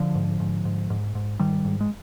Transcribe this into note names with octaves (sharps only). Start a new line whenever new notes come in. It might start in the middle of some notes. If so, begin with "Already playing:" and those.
Already playing: D3 F3
G#2
G#2
G#2
G#2
G#2
G#2 D#3 G3
G#2
G#3